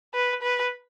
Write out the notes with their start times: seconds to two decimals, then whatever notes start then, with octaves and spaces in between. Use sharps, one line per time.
0.14 B4
0.42 B4